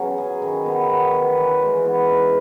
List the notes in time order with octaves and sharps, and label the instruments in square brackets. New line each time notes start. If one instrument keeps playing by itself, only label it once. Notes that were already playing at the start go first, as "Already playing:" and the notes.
Already playing: [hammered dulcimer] C#3 F#3 B3 C#4
G#4
D#3
B3
F#4
B4
E3
G#3
B3
D#4